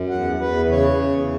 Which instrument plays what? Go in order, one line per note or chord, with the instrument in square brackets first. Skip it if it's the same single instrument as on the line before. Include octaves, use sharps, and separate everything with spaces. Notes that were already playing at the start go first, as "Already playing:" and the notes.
Already playing: [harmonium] F#2
E2 F#5
E2 B4
C#3 C#5
E2